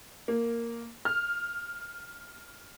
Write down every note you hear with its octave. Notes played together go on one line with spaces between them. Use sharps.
A#3
F6